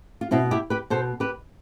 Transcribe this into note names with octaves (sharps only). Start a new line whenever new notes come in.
F4
B2 C4 E4
E4 G4
G4 B4
B2 A4 C5
G4 B4